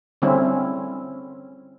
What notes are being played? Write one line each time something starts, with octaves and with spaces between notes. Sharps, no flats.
D3 G3 C4 C#4 E4